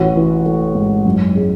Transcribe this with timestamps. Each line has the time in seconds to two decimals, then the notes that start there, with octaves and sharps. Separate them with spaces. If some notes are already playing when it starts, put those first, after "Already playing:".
Already playing: A1 F#4
0.16 E3
0.45 A3
0.75 G#2
1.05 F#2
1.35 G#3